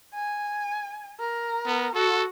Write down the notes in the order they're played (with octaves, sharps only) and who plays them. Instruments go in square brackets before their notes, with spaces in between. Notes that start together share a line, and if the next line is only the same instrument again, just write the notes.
[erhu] G#5
A#4
[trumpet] B3
[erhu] F#4 [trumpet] A4